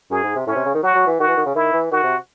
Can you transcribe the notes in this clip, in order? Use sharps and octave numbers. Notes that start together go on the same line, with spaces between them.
F#2 G#4
G#2
C3
A2 C#4
C3
C#3
D#3
F#3 F#4
F#3
E3
D#3 F#4
E3
D#3
C#3
D#3 E4
E3
D#3 F#4
C3